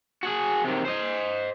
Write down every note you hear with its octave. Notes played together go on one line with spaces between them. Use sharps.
F#4 G#4
C3 D#3
C5 D#5